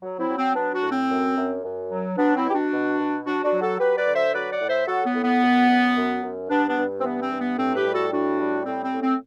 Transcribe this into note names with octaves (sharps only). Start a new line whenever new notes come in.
F#3
C4 E4
F#3
C4
F#3 B3 D4
D4 F#4
A2
C4
F#2
F#2
F#2
F#3
F#3 B3 D4
C4 E4
B2 G4
D4 F#4
B2
B2
F#3 D4 F#4
D4 F#4
F#3
F#4 A4
F#3 G4 B4
B4 D5
D3
C5 E5
F#3 B4 D5
D5 F#5
A2
C5 E5
F#3 F#4 A4
B3
A2
B3
F#2
F#2
F#2
F#2
G2 B3 D4
B3 D4
G2
C4
E3 B3
C4
G2
B3
A2 C4
G4 B4
G3
F#4 A4
A2 D4 F#4
G3
A2 C4
C4
A2
C4